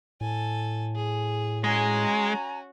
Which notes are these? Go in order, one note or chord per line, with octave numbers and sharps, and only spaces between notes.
A2 A4 G#5
G#4
G#3 C#4 F#4 G#5 A#5